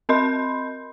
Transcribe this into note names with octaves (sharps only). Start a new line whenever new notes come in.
C4 A#4 D#5 B5 C6 G6